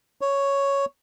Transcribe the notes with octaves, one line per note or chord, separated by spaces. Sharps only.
C#5